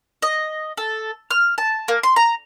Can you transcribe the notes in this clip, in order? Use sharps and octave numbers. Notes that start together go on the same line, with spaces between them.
D#5
A4
F6
A5
A#3
C6
A#5